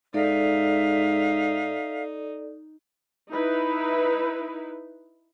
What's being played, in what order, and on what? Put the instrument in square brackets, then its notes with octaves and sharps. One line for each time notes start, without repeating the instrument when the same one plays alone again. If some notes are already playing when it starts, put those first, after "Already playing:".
[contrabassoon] G#2 [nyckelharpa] D#4 [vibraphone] A4 D5 [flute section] E5 F5
[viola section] D#4 E4 B4